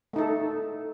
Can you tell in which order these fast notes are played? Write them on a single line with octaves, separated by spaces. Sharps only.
A3 D#4 A4